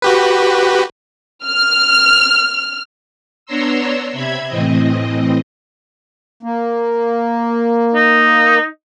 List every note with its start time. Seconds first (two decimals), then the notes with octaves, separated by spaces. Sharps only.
0.02 F#4 G4 B4
1.45 F6
3.46 B3 D4 C#5 A#5 C6 E6
4.13 C3 E5 B5 G#6
4.48 A2 E3 C4 D#5
6.43 A#3
7.95 D#4